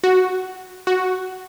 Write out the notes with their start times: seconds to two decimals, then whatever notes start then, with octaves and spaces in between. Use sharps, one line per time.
0.04 F#4
0.87 F#4